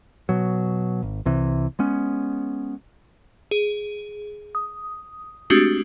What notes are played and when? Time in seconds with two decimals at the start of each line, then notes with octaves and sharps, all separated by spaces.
0.29 B2 F#3
1.03 G#1
1.26 C2 C3 E3
1.79 G#3 B3 C#4
3.51 G#4
4.55 D#6
5.50 G#3 A3 C4 D4 F#4 G4